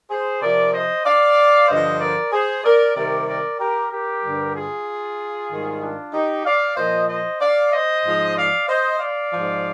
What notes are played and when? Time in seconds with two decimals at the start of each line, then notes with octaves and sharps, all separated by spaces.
0.09 G#4 C5
0.41 C3 F3 A#4 D5
0.73 C5 D#5
1.05 D5 F5
1.68 G2 D3 F3 C5 D#5
2.00 A#4 D5
2.32 G#4 C5
2.64 A#4 D5
2.96 C3 D#3 G3 A#4 D5
3.27 A#4 D5
3.59 G4 A#4
3.91 G4 A#4
4.23 G2 D3 G3
4.54 F4 G#4
5.50 G#2 D#3 G3
5.82 D4 F4
6.13 D#4 G4
6.45 D5 F5
6.77 A#2 F3 C5 D#5
7.08 C5 D#5
7.40 D5 F5
7.72 C5 D#5
8.04 G#2 F3
8.35 D5 F5
8.68 C5 D#5
8.99 D5 F5
9.31 G#2 F3